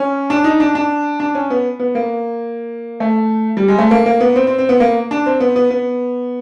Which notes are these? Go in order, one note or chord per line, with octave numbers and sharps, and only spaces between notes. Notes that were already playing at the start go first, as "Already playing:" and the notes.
Already playing: C#4
D4
D#4
D4
D4
D4
C#4
B3
B3
A#3
A3
G3
G#3
A3
A#3
A#3
B3
C4
C4
C4
B3
A#3
D4
C4
B3
B3
B3